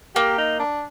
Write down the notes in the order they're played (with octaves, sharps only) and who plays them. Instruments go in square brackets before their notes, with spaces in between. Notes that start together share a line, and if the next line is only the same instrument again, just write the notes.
[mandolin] A#3 [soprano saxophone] G4
[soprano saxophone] D#4
D4